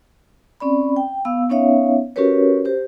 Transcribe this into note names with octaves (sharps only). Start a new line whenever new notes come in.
C4 C#4 D5 B5
G5
B3 F5 E6
B3 C#4 D#4 C#5 E5 F5
C#4 F#4 G4 A#4 B4 C#5
G4 C5